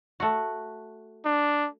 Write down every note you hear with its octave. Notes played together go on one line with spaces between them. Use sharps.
A3 F#4
D4